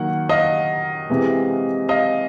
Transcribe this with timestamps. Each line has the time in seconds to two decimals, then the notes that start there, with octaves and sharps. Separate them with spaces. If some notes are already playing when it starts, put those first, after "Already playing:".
Already playing: D#3 F#3 A#3 F#5
0.29 D#5 F5
1.10 C3 E3 G#3
1.89 D#5 F5